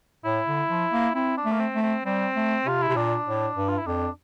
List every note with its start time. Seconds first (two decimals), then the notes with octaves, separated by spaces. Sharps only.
0.24 A2 E4
0.46 D3
0.69 F3
0.93 A#3
1.15 C4 E4
1.37 D4
1.45 A3
1.52 A#3
1.60 C4
1.75 A3
1.82 C4
2.05 G3 C4
2.36 A3
2.66 C3 F4
2.83 E4
2.89 C3
2.96 A#2 D4
3.26 A2
3.56 G2
3.68 F4
3.78 E4
3.86 F2 D4